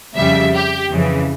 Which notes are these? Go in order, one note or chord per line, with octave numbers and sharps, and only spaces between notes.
F2 C#3 G3 E5
G4
F2 C#3 E3